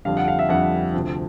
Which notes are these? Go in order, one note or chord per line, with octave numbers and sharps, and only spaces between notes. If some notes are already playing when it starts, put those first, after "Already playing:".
F2 D3 G3 F5
F#5
F5
E5
F2 D3 G3 F#5
D2 C3 F3